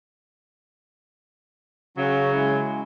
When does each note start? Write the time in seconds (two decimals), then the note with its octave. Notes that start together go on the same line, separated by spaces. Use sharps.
1.97 C#3 F#3 C#4
2.32 G#3 E4